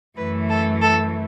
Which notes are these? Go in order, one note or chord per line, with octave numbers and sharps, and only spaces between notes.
F#2 E3 A3 B4
A4
A4